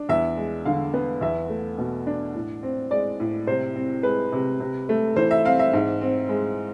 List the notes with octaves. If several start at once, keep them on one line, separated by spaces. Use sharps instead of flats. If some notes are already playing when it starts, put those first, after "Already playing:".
Already playing: D4
E2 E5
G#3
D3 F5
B3
E2 E5
A3
B2
D4
A2
C4
G#3 D5
A2
C3 C5
C4
G#3 B4
C3
C3
A3
E3 C5
E5
C4 F5
E5
G#2
C4
G#3